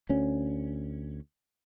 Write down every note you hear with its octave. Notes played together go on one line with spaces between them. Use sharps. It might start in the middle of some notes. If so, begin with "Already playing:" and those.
D2 C#4